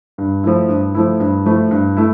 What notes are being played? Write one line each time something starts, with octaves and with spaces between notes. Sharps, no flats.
G2
F3 A3 E4
G2
F3 A3 E4
G2
F3 A3 E4
G2
A3 E4